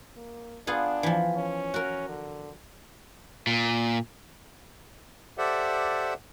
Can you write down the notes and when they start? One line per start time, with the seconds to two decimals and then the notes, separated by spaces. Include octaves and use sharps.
0.17 A#3
0.67 B3 D4 F4 G#4
1.03 E3 F3
1.36 C#4
1.74 F#4 A#4
2.09 D3
3.47 A#2
5.38 G4 A4 C5 D5 E5 F#5